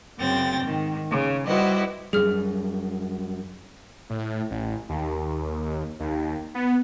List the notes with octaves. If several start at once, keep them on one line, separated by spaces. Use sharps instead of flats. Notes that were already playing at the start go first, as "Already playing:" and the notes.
F#2 C#3 C4 G5 A6 A#6
G#2 D#3
C#3
G3 E4 F#4 B4 C5 D#5
F#2 G3 G#4 F6
A2
A1
D#2
D#2
B3